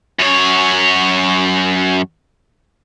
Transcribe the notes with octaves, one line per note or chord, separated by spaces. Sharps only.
F#2 C#5